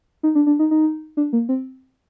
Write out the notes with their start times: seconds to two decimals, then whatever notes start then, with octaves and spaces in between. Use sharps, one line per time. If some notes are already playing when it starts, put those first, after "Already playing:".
0.23 D#4
0.35 D4
0.47 D4
0.59 D#4
0.71 D#4
1.17 D4
1.33 A#3
1.49 C4